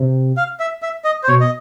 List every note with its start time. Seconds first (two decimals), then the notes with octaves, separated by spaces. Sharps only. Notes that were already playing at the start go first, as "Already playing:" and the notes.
Already playing: C3
0.37 F5
0.60 E5
0.82 E5
1.04 D#5
1.23 C5
1.28 B2 C#5
1.41 D#5